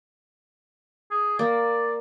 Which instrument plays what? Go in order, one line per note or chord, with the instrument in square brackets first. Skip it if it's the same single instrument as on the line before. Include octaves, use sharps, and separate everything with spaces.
[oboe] G#4
[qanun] A#3 [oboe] D5